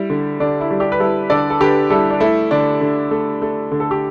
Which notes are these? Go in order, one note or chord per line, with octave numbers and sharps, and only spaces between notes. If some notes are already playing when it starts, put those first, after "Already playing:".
Already playing: G3 E4
D3
D3 D4
E4
G3
D4 G4
B4
G3 E4 A4
D3 A4 D5
A4
D3 G4 B4
G3 E4 A4
D4
A3 E4
D3 D4
D3
A3
A3
D3
A4
G4